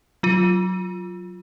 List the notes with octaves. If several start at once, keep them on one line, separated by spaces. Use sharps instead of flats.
F#3 F4